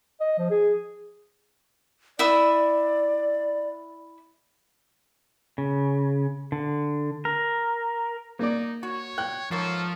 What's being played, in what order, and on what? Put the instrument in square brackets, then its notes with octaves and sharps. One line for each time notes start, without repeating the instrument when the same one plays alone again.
[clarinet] D#5
F3
G#4
[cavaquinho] E4 E5 D#6 [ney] D5
[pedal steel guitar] C#3
D3
A#4
[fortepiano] A#3 D5 [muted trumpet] D#4
[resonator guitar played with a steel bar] F#4 [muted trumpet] C#5
[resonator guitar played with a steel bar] G5 [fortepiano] F#6
[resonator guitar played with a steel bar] G#2 A#4 C#5 [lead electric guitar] F3 [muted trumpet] A4